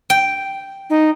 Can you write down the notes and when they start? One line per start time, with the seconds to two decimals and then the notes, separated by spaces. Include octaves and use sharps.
0.10 G5
0.90 D#4